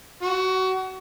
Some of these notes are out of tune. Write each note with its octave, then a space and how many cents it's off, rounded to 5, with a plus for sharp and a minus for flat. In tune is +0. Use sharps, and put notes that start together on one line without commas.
F#4 +25